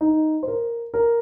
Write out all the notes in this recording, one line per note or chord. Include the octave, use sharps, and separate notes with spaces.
D#4
C5
A#4
A#4